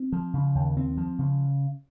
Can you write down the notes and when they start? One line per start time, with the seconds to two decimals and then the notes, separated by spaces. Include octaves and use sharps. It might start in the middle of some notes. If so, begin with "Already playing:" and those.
Already playing: C4
0.12 F3
0.34 C#3
0.55 D#2
0.77 C4
0.97 F3
1.19 C#3